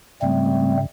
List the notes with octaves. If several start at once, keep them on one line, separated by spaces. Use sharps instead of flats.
G#2 C#3 G3 A3 C4